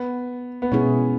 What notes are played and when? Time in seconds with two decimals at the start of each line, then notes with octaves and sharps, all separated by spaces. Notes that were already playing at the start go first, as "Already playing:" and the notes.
Already playing: B3
0.62 B3
0.72 B2 G#3 C#4 E4 G#4